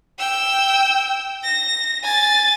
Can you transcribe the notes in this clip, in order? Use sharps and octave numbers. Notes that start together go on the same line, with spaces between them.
G5 E6
A#6
G#5 A6